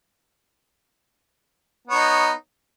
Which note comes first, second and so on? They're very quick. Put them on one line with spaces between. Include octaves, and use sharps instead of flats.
B3 C#5 D#4